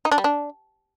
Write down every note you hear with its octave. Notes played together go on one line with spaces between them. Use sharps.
D#4
D4
G3
D4